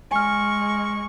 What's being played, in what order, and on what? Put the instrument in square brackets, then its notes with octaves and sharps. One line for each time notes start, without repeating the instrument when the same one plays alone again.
[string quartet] G#3 C#6 [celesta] G#5 F6